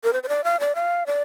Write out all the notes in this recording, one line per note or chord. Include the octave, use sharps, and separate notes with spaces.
A#4
C5
C5
D5
F5
D5
F5
D5